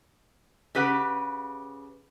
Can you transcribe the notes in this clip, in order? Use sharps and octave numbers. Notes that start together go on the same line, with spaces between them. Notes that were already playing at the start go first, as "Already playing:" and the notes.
C#3 G4 B4 F#5